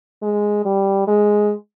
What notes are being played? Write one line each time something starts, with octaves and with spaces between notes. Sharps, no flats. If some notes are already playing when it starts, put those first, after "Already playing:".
G#3
G3
G#3